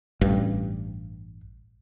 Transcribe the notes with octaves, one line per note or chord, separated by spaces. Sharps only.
A1 G2